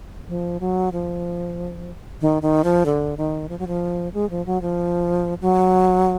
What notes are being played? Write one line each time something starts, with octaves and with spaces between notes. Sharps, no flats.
F3
F#3
F3
D#3
D#3
F3
D3
D#3
F3
F#3
F3
G#3
F3
F#3
F3
F#3